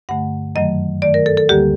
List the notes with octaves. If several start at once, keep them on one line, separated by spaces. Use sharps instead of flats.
G2 D3 A3 F#5
F#2 D#3 F#3 A3 D#5
G2 D#3 A3 D5
A#4
A4
A4
D2 D3 G3 A#3 G4